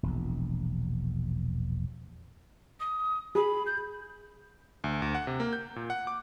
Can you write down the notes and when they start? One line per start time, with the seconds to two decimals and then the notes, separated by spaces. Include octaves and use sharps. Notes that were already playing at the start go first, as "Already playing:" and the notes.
0.03 E1 A#1
2.80 D#6
3.35 G#4 B5
3.66 G6
4.84 D2
5.02 D2
5.15 F#5
5.27 C3
5.40 A#3
5.53 G6
5.76 A#2
5.90 F#5
6.07 D6